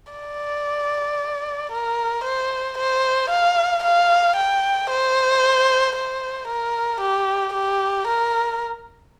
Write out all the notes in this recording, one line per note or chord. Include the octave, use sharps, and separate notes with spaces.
D5
A#4
C5
C5
F5
F5
G5
C5
C5
A#4
G4
G4
A#4